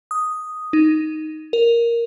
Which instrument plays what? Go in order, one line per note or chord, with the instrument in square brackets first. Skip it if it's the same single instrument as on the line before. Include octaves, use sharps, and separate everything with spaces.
[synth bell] D#6
D#4
A#4